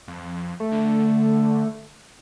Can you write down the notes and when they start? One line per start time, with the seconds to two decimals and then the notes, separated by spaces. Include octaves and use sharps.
0.08 F2
0.60 A3
0.71 D3